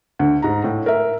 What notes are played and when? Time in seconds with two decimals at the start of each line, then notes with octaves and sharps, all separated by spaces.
0.19 D2
0.42 G#2 A#5
0.64 A2
0.86 A#4 E5